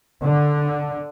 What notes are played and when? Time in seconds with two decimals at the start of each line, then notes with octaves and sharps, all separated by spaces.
0.21 D3